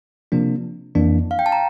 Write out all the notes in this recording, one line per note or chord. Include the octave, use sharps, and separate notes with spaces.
C3 F3 A#3 D4
F2 E3 A#3 D4
F5
G5
A5
A#5